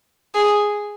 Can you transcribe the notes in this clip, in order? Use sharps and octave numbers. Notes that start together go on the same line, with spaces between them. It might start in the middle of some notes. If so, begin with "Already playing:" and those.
G#4